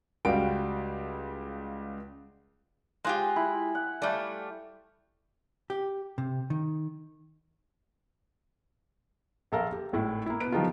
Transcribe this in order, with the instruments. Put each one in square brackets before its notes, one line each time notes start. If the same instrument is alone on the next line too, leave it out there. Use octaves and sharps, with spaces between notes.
[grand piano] C#2 G3 F#4 F5 G5 D7
[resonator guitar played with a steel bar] G#3 F4 G4 [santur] C5 F#5 G#5
[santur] E4 B5
F#5
[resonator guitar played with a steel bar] G3 A3 [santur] D5 F5 G5
[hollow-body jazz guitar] G4
C3
D#3
[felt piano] A#1 A4 A#4 F5
G4
G#1 A2 E4
A#3 E4
B2 B4 D7
D#3 F3 G3 B3 D#4 F4